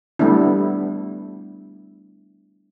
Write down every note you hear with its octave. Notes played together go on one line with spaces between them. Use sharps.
G3 A3 B3 D4 E4